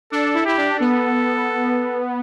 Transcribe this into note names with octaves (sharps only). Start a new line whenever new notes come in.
D4 A4
E4
E4 G4
D4
B3 A4